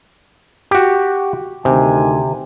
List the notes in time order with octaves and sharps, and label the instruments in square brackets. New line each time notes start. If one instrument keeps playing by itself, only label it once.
[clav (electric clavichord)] F#4 G4
[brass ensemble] D2 D#3 G#5 [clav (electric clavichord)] C3